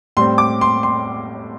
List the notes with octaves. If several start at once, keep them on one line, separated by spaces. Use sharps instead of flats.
A2 G3 C4 C6
D6
C6
C6